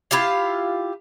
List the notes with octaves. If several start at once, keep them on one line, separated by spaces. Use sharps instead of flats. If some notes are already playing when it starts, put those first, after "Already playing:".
E4 F4 G4 F5